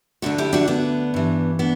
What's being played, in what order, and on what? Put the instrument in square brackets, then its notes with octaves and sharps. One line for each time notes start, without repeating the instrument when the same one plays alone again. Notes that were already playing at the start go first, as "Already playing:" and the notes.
[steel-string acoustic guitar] D2 D3 D4 F#4
E4 G4
D4 F#4
B3 D4
G2 E3
B3 D4